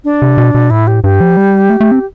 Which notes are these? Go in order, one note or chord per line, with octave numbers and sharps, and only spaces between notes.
D4
C3
B2
B2
A2 E4
G4
G2 G4
F3
G3
A3
A3
C4